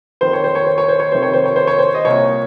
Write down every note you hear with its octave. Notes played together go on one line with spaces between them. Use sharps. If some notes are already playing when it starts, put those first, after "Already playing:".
F2 D#3 C5
C#5
C5
C#5
C5
C#5
C5
C#5
F2 C3 D#3 C5
C#5
C5
C#5
C5
C#5
C5
D#5
C2 A#2 C#5